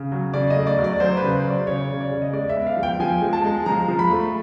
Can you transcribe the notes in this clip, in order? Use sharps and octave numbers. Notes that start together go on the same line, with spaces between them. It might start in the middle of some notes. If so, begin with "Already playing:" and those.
Already playing: C#3
F#3
C#3 D5
D#5
A3
D5
F#3
D5
F#3 C5
B4
C#3
C5
F#3
D5
C#3 C#5
C#3
D5
C#3
D#5
G#3 D5
E5
B3
F5
F3
G5
F3 G#5
G#3
A5
G#3
F3 A#5
F3
B5
A3